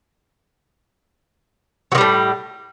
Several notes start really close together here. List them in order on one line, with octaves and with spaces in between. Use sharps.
F#3 D#3 G3 A2